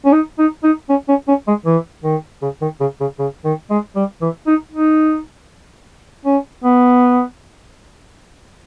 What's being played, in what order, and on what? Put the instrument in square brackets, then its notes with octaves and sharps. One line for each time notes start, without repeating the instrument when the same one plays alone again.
[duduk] C#4
D#4
D#4
D#4
C#4
C#4
C#4
G#3
E3
D#3
C#3
D#3
C#3
C#3
C#3
D#3
G#3
G3
E3
D#4
D#4
C#4
B3